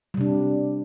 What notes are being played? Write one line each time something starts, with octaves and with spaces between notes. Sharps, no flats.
C3 G3 D4